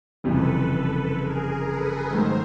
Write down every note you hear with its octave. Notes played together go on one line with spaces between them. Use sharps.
F#1 F2 C3 E3 G3 A4 B4
A4 B4
G#4 A#4
A4 B4
G#2 D#3 F#3 A3 A#4 C5